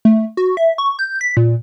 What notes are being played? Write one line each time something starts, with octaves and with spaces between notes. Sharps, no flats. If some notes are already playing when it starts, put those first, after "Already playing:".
A3
F#4
E5
C#6
G6
B6
A#2